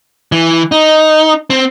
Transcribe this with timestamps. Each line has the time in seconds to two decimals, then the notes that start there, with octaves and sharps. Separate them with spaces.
0.32 E3
0.72 D#4
1.50 C4